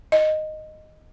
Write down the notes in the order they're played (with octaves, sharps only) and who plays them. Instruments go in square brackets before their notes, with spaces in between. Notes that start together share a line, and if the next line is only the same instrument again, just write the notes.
[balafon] D#5